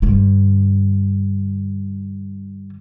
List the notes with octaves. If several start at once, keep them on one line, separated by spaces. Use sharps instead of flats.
G2 D3